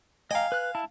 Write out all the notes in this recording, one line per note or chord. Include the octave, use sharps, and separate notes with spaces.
D#5 F5 G5 G#5 A#5
B4 F#6
E4 A5